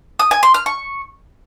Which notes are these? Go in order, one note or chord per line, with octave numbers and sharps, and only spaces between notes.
D#6
G#5
C6
F6
C#6